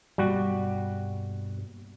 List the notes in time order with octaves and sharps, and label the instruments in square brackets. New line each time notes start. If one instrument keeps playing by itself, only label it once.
[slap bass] G2 B2 A#3 [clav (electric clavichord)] G3 F#4